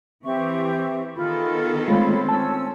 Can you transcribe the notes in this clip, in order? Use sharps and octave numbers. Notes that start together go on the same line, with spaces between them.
E3 C4 G4 E5 C#6
D#3 B3 F4 G#4 A4 B5
G#3 A3 C4 F4 C#5 F5 B5
C#4 A5 E6